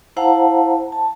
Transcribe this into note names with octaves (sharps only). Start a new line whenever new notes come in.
E4 C5 F5 F#5 A5 A#5
A5